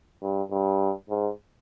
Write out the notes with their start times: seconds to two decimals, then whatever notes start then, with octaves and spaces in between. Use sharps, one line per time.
0.22 G2
0.51 G2
1.09 G#2